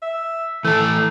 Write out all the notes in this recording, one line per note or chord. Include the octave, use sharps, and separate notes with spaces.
E5
E3 A3 A4